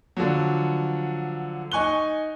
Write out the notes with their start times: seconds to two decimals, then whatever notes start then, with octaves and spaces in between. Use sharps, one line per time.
0.17 D3 F3 F#3
1.72 D#4 G#5 C#6 F#6 G7